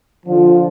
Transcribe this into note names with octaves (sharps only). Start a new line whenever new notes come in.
D3 F3